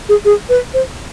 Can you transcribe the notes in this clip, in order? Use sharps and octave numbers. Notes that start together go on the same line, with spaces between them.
G#4
G#4
B4
C5